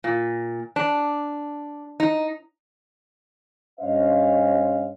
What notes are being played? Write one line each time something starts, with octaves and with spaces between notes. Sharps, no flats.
A#2
D4
D#4
G2 C#4 C5 C#5 D#5 F5